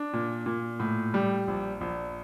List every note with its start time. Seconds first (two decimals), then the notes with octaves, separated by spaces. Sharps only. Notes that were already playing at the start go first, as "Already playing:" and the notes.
Already playing: D4
0.13 A#2
0.46 A#2
0.80 A2
1.14 G3
1.48 A#1
1.81 A#1